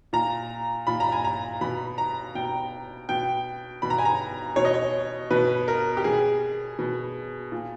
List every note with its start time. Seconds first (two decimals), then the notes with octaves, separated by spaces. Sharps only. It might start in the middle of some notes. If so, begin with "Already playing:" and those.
0.13 A#2 A#5
0.87 A#2 B5
1.00 A#5
1.12 G#5
1.24 A#5
1.61 B2 B5
1.98 A#5
2.35 B2 G5
3.09 B2 G5
3.82 B2 B5
3.90 A#5
3.98 G#5
4.05 A#5
4.56 B2 C#5
4.65 D#5
4.74 C#5
5.31 B2 B4
5.68 A#4
5.97 G4
6.04 B2 G#4
6.79 B2
7.52 A#2